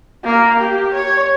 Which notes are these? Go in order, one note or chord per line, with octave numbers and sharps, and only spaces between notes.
A#3
G4
C#5